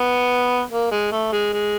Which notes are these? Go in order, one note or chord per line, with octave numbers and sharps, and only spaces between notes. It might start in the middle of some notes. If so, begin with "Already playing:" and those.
Already playing: B3
A#3
G#3
A3
G#3
G#3